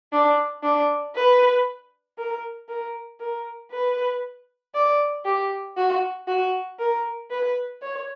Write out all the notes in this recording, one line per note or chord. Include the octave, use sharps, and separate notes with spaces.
D4
D4
B4
A#4
A#4
A#4
B4
D5
G4
F#4
F#4
A#4
B4
C#5